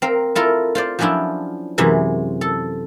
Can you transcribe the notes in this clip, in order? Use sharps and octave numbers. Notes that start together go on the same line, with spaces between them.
C4 A#4 F5
E4 F4 A4 A#4
F4 C5 D5
F3 F#3 C#4 D4 E4 F4
F#2 C3 E3 G#3
A4